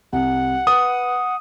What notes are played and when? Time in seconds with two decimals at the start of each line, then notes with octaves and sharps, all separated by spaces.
0.13 C2 F#5
0.67 B4 D#6